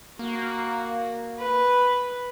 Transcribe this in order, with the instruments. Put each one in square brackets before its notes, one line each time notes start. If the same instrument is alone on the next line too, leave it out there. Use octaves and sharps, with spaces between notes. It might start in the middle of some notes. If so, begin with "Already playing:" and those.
[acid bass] A#3 [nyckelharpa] F#4
[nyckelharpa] B4